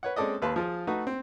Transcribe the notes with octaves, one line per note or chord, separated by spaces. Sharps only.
B4 C#5 F#5
G#3 C4 C#4 A4 D5 D#5
D#2 B4 F5 A5 C6
F3 F4 G#4
A3 D#4 F#4 B4
C4